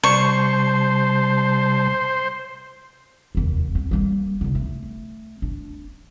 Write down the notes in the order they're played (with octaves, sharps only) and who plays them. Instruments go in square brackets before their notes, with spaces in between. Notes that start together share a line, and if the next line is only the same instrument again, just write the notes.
[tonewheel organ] C3 G3 A5 [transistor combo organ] C5 [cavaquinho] C#6
[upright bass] F1 D#2
C4
G3 A#3
C2 D3
A3
D4